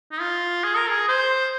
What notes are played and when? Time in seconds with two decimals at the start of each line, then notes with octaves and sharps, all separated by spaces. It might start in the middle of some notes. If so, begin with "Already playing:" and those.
0.12 D#4
0.21 F4
0.64 G#4
0.76 A#4
0.89 G#4
1.08 C5